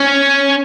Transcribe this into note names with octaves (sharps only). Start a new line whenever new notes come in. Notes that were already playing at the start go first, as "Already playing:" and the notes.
Already playing: C#4